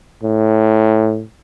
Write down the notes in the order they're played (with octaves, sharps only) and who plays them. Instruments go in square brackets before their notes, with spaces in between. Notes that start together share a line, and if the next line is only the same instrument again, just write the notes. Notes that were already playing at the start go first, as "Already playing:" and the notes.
[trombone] A2